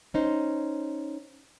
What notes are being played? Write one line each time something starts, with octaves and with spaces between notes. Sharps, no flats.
C#4 D#4 C5